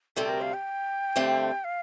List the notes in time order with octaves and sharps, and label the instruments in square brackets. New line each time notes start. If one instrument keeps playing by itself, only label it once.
[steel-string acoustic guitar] D2 C3 G3 C4 [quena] A4
[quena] A#4
F5
G5
[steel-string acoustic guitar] G2 D3 A3 C4
[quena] F5